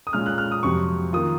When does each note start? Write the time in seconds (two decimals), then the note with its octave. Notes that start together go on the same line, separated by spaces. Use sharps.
0.07 D#6
0.13 A#2 G#3 C#4 F4 F6
0.26 F#6
0.38 F6
0.52 D#6
0.63 F2 C3 F#3 C#6
1.13 D#3 A#3 F4 D#6